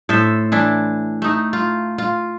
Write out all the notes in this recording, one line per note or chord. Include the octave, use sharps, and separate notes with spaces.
A2 A4 C5 E5
E3 D4 E4
A3 D#4
F4
F4